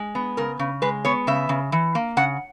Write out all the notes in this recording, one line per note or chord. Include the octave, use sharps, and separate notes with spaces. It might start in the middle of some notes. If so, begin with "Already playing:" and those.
Already playing: G#3
B3
C#3 A#4
C#3
G#3 B4
B3 C#5
C#3 E5
C#3
E3
A#3
C#3 F#5